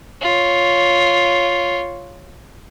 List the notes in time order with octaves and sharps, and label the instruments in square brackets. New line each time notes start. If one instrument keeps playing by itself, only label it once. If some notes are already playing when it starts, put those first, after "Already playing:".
[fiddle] F4 C#5